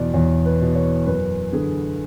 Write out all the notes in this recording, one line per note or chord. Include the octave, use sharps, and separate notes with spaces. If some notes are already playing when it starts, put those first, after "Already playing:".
Already playing: E2 B2 D5
E2 C#5
B4
B2
C#5
F#2 B4
D3 G#4